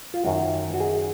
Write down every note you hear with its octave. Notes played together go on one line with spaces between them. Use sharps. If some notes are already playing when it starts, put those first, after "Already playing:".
F4
F#2 D#3 F#3 F#4
F#4
G#4